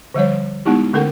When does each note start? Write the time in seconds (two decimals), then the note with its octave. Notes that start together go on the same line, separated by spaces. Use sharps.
0.14 D3 F3 G3 C#5
0.65 G#3 B3 D#4 E4 G4
0.94 D3 A3 C#4 A4 A#4 F#5